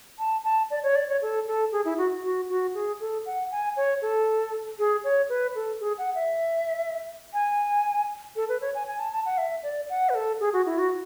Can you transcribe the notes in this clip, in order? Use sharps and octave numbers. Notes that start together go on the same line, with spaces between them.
A5
A5
D5
C#5
D5
C#5
A4
A4
G#4
E4
F#4
F#4
F#4
G#4
A4
F#5
G#5
C#5
A4
G#4
C#5
B4
A4
G#4
F#5
E5
G#5
A4
B4
C#5
G#5
G#5
A5
A5
F#5
E5
D5
F#5
B4
A4
G#4
F#4
E4
F#4